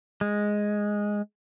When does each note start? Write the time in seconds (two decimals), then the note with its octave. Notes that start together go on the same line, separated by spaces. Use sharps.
0.21 G#3